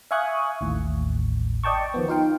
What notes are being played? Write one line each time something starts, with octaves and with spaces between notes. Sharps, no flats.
E5 F5 G#5 C#6 D#6 F#6
A1 D#2 A2
D5 D#5 G5 A5 C#6
D#3 F3 B3
D#4 F4 F5 G5